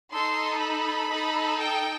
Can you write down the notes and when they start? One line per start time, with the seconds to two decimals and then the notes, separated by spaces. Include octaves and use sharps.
0.12 D#4 A4 C6
0.60 B5
1.10 D#4 A4
1.58 G5